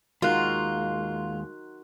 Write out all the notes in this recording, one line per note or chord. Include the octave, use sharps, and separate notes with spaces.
D#2 G#3 D#4 F4 F#4 A#4 C6 F#6